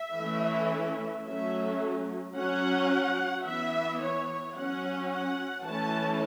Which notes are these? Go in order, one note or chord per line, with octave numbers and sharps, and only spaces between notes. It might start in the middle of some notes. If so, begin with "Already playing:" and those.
Already playing: E5
E3 A3 C#4
F#3 A3 C#4 E5
F#3 C#4 F#5
E3 B3 E5
C#5
F#3 C#4 F#5
F#5
E3 A3 C#4 A5